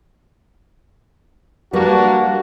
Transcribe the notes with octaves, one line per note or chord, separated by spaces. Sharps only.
G3 A#3 D4 F#4 B4